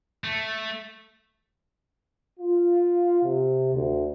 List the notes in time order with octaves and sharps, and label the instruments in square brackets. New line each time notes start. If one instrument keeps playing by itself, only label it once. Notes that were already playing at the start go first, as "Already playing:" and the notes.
[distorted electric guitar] A3
[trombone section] F4
C3
D2